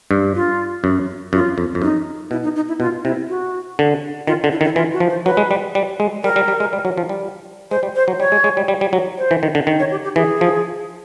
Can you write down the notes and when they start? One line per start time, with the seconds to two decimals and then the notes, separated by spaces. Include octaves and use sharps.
0.11 G2
0.35 F4
0.84 F#2
1.33 F#2 F4
1.58 F2
1.75 F2
1.82 F#2 D#4
2.31 B2 E4
2.44 D#4
2.56 D#4
2.68 E4
2.80 B2 F4
3.05 C3 E4
3.29 F#4
3.79 D3
4.27 D#3 F4
4.44 D3
4.51 E4
4.61 D#3
4.64 E4
4.76 E3 F4
4.93 F#4
5.00 F3
5.09 C5
5.26 F#3 B4
5.37 G#3
5.51 G3
5.75 G3
6.00 G#3
6.23 G3 A#4
6.36 G3
6.48 G3
6.60 G#3
6.73 G3
6.85 F#3
6.98 F3
7.09 G3
7.71 G#3 C5
7.83 G3
7.96 C5
8.08 F#3
8.20 G3 C#5
8.32 G#3
8.44 G#3
8.57 G3
8.68 G3
8.81 G3
8.93 F#3
9.18 C5
9.31 E3
9.43 D#3
9.55 D3
9.67 D#3
9.79 C#5
9.91 G4
10.04 G4
10.16 E3 G#4
10.41 F3